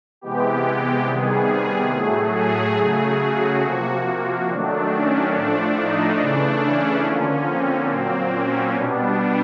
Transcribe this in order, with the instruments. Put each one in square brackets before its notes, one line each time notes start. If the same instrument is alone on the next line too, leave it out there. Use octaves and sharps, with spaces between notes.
[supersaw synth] C3 E3 G#3 B3 G4
G4
C3 D#3 G3 B3 G#4
A2 F#3 A3
G#4
C#3 F#3 A3 G#4
F#4
C3 F3 A#3
D#3 F#3 A3 D4
C#4
A2 F3 A3 D4
D#4
C#3 E3 A3 D4
C#4
D3 F3 A#3 C#4
C4
A#2 F#3 A#3 C4
C#4
B2 G3 B3 D4